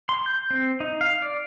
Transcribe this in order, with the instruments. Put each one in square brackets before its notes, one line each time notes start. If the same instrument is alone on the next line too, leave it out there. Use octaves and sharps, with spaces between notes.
[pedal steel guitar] C6
G6
C4
D#4
F5
D5